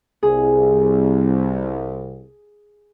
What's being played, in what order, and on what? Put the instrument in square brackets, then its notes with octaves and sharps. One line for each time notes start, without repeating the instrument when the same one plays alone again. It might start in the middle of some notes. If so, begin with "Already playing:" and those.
[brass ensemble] C2 [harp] G#4